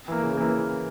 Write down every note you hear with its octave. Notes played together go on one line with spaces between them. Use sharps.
E3 A#3
C#3
E3 A#3